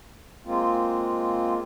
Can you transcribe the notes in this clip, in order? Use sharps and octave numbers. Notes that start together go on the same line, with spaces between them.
G#3 A#3 C4 F4